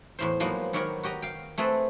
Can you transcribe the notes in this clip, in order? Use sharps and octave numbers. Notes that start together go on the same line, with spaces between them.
E2 A2 C5
F3 F#3 G#3 A#3 B3 D#4
D#3 F#3 B3 G4 A#4 C#5
F#4 G4 D#5 A#5
F5 G5
A3 C4 G#4 A4 B4